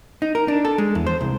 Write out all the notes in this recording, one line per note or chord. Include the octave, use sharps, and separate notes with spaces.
D#4
A#4
D4
A4
G#3
E2
C5
C2